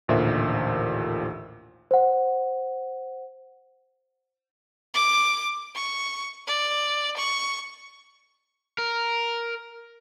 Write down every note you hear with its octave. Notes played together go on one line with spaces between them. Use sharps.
A1 D#2 A#2 D3 C5 E5
C5 F#5
D6
C#6
D5
C#6
A#4